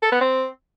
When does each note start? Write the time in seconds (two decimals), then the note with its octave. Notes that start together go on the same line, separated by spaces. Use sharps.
0.03 A4
0.12 B3
0.21 C4